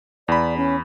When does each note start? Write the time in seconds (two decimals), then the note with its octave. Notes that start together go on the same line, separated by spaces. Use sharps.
0.28 E2 D5 B5
0.57 C#4